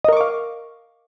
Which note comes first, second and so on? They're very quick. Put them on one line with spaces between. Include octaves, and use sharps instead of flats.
D#5 A#4 C#6 D6 F5